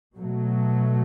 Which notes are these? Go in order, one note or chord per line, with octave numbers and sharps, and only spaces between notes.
B2 F#3 A3